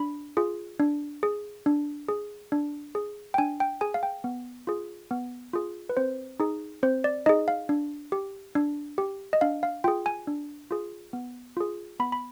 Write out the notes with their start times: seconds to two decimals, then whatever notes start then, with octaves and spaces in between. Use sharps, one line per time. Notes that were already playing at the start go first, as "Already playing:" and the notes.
Already playing: D4 B5
0.37 F4 G#4
0.80 D4
1.23 G#4
1.66 D4
2.08 G#4
2.52 D4
2.95 G#4
3.34 G5
3.38 D4 G#5
3.60 G5
3.81 G#4 G#5
3.94 F5
4.03 G5
4.24 B3
4.67 F4 G#4
5.11 B3
5.53 F4 G#4
5.89 B4
5.97 C4 C5
6.40 D#4 G#4
6.83 C4 C5
7.04 D5
7.26 D#4 G#4 D#5
7.48 F5
7.69 D4
8.12 G4
8.55 D4
8.98 G4
9.33 D#5
9.41 D4 F5
9.63 F5
9.84 F4 G#4 G5
10.06 G#5
10.27 D4
10.71 F4 G#4
11.13 B3
11.57 F4 G#4
12.00 B3 B5
12.12 B5